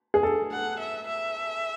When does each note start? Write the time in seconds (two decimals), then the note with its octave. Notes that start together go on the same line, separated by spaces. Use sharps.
0.14 G#4
0.23 A4
0.52 F#5
0.80 E5
1.08 E5